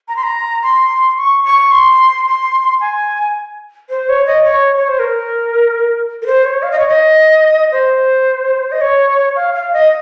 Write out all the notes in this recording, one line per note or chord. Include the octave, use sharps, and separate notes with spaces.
A#5
C6
A#5
C6
C#6
C#6
C6
C6
G#5
C5
C#5
D#5
C#5
C#5
C5
A#4
A#4
C5
C#5
F5
D#5
C#5
D#5
C5
D#5
C#5
F5
F5
D#5